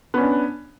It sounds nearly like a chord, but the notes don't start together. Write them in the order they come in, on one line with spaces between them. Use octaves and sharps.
B3 C#4 D4